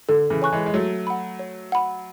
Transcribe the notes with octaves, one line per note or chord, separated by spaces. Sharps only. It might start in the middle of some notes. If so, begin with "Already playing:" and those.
D3 A4
C#3 E3
C#5 G#5 C#6 F#6
E3 G#3
G#3
F#3 A3 C#5
F#5 B5
C#5
F#5 B5